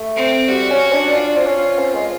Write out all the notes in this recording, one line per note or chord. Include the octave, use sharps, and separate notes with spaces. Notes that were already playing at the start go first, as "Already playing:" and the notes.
Already playing: A3
C4
G3 F#4
C#4
D4
D4 F4
C4
C#4
C4
G#3